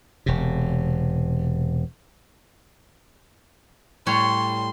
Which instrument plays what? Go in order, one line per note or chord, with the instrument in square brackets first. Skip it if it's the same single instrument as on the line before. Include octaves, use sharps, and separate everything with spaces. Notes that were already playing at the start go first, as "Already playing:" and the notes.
[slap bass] E1 C3
[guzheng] A2 G3 C#5 [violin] C6